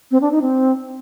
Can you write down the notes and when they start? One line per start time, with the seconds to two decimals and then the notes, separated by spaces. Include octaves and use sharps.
0.11 C4
0.21 D4
0.32 D#4
0.42 C4